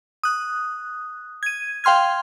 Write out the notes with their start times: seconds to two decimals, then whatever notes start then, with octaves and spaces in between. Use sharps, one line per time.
0.23 D#6 F#6
1.43 G#6 D#7
1.84 F5 G5 C6 F6 G#6